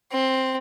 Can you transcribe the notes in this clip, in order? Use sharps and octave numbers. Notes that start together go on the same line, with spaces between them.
C4